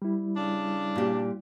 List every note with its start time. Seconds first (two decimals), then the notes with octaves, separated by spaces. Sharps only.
0.02 G3 E4
0.36 C#3 D4
0.96 A#2 G4